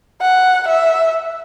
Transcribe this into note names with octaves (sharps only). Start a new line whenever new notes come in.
F#5
E5